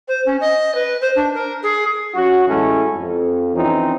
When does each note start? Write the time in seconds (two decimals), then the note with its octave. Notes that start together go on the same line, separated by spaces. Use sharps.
0.08 C5
0.26 C#4
0.40 D#5
0.75 B4
1.01 C5
1.15 D4
1.34 A#4
1.63 G#4
2.15 F#3 C#4 F#4
2.47 A1 G#3 C#4 E4 A4
2.95 F2
3.54 E3 F3 C4 C#4 D#4